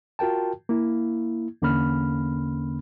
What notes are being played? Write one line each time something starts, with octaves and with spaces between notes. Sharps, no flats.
F4 F#4 A#4 G5 A5
A#3 E4
E2 D3 A#3 C#4 B5 F6